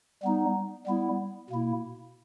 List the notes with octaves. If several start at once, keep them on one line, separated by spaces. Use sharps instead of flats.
G3 B3 D#4
G3 B3 E4
B2 A#3 E4